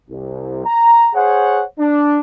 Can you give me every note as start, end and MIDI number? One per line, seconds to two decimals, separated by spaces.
0.10 0.64 36
0.65 1.09 82
1.14 1.62 68
1.14 1.62 72
1.14 1.62 73
1.14 1.62 78
1.79 2.20 62